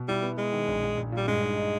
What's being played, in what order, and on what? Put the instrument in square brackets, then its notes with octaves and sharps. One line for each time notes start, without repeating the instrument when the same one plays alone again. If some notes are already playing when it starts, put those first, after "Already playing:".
Already playing: [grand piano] B2
[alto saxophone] G3 [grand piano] E4
[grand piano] B3
[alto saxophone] G#3 [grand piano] B3
[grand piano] D#3
A#1
A#1
A#1
[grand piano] A#2 [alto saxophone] G3
[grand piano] G2 [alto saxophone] G#3
[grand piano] D#4
D#4